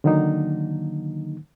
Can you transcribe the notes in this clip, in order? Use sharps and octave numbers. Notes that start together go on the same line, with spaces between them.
D3 D#3 F#3 A#3 D#4